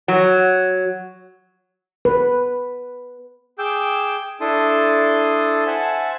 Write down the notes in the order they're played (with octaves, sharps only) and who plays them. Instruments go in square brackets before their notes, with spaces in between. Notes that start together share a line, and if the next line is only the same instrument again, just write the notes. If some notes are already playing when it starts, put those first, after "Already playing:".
[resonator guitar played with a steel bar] F#3
[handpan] B4
[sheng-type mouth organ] G#4 G5 D6 E6 G6
D4 E4 A4 A5 C6 D#6
C5 E5 F#5 G#5 A5